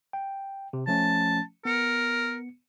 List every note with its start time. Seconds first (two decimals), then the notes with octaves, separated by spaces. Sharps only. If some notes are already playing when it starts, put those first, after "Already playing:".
0.13 G5
0.73 C3
0.87 F3 A3 C#4 A5
1.65 B3 A#4 C#7